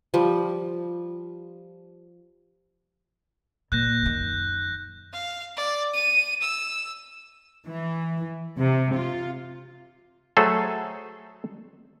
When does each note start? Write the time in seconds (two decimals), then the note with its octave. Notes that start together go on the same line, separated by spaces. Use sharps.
0.14 F3 G3
3.72 A#2 F#6 G6 A#6
4.02 F#2 D#3
5.13 F5
5.57 D5
5.93 D#7
6.41 E6
7.66 E3
8.57 C3
8.95 F4
10.37 F#3 A3 G#4 A4 C5